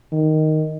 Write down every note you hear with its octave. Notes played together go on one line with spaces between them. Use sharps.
D#3